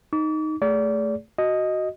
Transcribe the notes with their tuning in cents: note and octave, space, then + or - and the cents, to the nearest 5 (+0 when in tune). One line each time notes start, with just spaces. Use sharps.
D#4 +0 D6 -40
A3 +0 G#4 +0 D5 -35
F#4 +0 D#5 +0